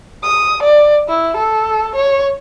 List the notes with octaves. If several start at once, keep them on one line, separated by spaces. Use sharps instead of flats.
D#6
D5
E4
A4
C#5